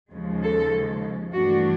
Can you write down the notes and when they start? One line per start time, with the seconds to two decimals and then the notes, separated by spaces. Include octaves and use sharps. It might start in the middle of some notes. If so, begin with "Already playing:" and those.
0.12 D#2 C#3 F3 G#3
0.42 A4
1.31 G2 E3 A3 D4 F#4